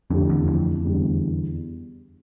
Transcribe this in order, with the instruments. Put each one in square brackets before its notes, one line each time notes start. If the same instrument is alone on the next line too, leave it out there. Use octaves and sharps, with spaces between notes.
[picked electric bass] F2 [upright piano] D3 A3 E4 G4
[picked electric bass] E2
F2
[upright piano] E2 D3 G3